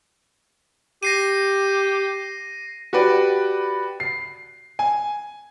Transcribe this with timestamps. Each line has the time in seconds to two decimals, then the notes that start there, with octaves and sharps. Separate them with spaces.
1.03 G4 A#6 C7 D#7
2.93 F#4 G4 B4 D5
4.00 C7
4.79 G#5